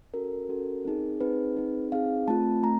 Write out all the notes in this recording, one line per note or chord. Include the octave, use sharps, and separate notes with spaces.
C#4 F#4 A4 A#4
C#4 F#4 A4
C4 D#4 G#4
C4 D#4 G#4 B4
C4 D#4 G#4
C4 D#4 G#4 F5
A3 C4 F4 A5
A3 C4 A#5